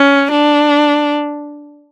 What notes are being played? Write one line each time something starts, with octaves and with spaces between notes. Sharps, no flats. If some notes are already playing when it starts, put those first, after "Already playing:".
Already playing: C#4
D4